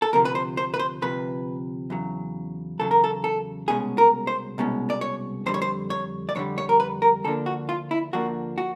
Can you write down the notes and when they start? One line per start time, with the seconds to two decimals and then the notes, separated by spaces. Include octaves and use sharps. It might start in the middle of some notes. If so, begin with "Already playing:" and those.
0.02 A4
0.13 D2 C3 F3 A#4
0.25 B4
0.35 C5
0.57 C5
0.74 B4
0.79 C5
1.02 D2 C3 F3 B4
1.90 E2 C#3 F#3
2.79 E2 C#3 F#3 A4
2.91 A#4
3.04 A4
3.24 A4
3.68 C2 B2 G#3 C#4 G#4
3.98 A#4
4.27 C5
4.58 C2 B2 G#3 C#4
4.90 D5
5.01 C#5
5.46 F2 D3 G3 C5
5.54 C#5
5.62 C5
5.90 C#5
6.29 D5
6.35 F2 D3 G3 C#5
6.58 C#5
6.69 A#4
6.80 B4
7.02 A#4
7.24 D2 D3 F3 A#3 D4 A4
7.46 F#4
7.69 F4
7.91 E4
8.13 D2 D3 F3 A#3 D4 F#4
8.58 F#4